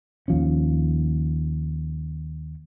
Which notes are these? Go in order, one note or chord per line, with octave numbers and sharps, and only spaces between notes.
D#2 F3 C#4